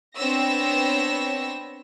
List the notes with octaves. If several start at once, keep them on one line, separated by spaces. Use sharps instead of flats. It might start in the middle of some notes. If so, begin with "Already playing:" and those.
B3 C4 D4 C#5 E6 A#6